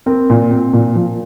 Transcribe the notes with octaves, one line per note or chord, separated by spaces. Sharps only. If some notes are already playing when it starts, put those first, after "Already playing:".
C4 A#4
A#2
C4
A#2
F3